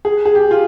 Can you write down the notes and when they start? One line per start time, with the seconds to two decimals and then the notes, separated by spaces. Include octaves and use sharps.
0.05 G#4
0.25 G#4
0.35 G4
0.51 F4